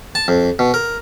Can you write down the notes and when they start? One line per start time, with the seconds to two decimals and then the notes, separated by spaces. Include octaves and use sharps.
0.15 A5
0.28 F2
0.59 B2
0.74 A#4